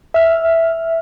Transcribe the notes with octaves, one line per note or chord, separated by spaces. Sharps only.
E5 F6